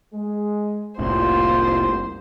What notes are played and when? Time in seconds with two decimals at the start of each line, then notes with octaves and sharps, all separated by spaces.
0.14 G#3
0.99 F1 C2 A2 A#3 F4 C5